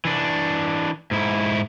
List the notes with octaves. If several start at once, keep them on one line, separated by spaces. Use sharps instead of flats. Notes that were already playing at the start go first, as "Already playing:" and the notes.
E3 D4
G#2 E4